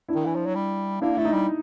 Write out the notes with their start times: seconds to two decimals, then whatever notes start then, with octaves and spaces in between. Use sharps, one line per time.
0.08 D4 E4
0.15 D#3
0.26 E3
0.35 F3
0.46 F#3
0.55 G3
1.01 A#3 D4 E4
1.17 A3 E4
1.25 D#4
1.33 G3